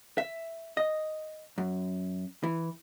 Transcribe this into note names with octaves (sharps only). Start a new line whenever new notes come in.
E5
D#5
F#2
E3